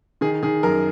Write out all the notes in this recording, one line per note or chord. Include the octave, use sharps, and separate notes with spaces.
D#3 G#4
D#3 G#4
F#2 A#4